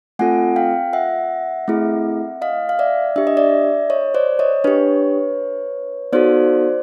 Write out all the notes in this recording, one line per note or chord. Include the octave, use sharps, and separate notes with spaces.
A3 C4 F4 A4 F#5 G#5
F5 G5
E5 F#5
A3 C4 E4 G#4
D#5 F5
F5
D5 E5
D4 G4 E5
D#5
D5 E5
C#5 D#5
C5 D5
C#5 D#5
D4 G4 B4 C#5
B3 D#4 F#4 A4 C5 D5